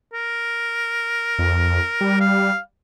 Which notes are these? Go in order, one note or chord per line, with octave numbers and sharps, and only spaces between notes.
A#4
F2
G3
F5